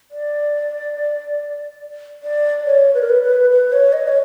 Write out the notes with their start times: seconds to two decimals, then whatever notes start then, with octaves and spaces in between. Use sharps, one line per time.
0.11 D5
2.23 D5
2.66 C#5
2.94 B4
3.01 A#4
3.10 B4
3.23 B4
3.50 B4
3.72 C#5
3.93 D#5
4.08 C#5